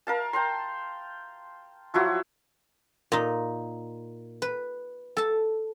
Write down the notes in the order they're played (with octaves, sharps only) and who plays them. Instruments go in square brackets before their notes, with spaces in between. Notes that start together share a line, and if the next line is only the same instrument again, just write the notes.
[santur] A#4 F5 A5
G5 A5 A#5 C6
F3 F#3 E4 F#4
[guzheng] A#2 D#4
B4
A4 A5